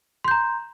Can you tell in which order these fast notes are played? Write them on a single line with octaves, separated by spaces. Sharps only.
C6 G6 A#5